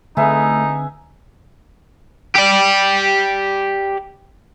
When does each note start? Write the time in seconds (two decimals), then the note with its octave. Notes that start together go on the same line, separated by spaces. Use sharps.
0.17 D3 A3 C4 D#4 G#4 B4 E5
2.36 G4 D5